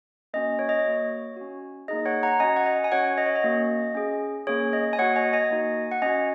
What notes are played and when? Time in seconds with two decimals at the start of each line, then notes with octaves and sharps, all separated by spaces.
0.34 A#3 C#4 F#4 D#5
0.59 C#5
0.69 D#5
0.79 C#5
0.85 A#3 F#4
1.37 C#4 F#4
1.88 A#3 D#4 G#4 D#5
2.06 C#5 F#5
2.23 F#5 A#5
2.40 C#4 F#4 D#5 G#5
2.57 F#5
2.66 D#5
2.84 G#5
2.92 C#4 F#4 C#5 F#5
3.18 D#5
3.26 C#5
3.36 D#5
3.44 A#3 C#4 F#4
3.95 C#4 G#4
4.47 A#3 C#4 G#4 C#5
4.73 D#5
4.93 G#5
4.99 A#3 F#4 C#5 F#5
5.16 D#5 G#5
5.33 D#5 G#5
5.50 A#3 D#4 F#4
5.91 F#5
6.02 C#4 F#4 D#5 G#5